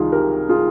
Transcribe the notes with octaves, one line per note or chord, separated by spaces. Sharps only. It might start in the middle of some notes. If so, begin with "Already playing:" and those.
Already playing: C2 D#3 F4 G#4
G4 A#4
F4 G#4